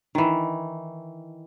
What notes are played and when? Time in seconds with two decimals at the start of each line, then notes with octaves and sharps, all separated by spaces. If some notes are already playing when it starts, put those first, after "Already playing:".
0.15 D#3 E3